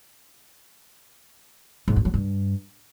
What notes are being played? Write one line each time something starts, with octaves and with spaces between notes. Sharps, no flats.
G#2
G2
F#3
G2